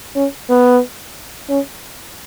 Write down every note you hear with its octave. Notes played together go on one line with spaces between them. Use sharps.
C#4
B3
C#4